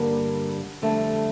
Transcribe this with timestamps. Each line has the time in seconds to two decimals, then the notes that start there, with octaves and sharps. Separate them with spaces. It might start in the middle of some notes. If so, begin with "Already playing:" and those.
Already playing: G2 D3 G3 A#3
0.82 F2 D3 G3 A3